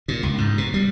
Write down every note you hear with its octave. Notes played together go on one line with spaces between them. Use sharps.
A#2
C#2
G#2
B2
G3